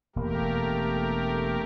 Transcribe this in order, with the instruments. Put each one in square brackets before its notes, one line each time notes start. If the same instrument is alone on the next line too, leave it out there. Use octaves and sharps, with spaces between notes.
[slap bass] E1 A#3 [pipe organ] A3 G4 A#4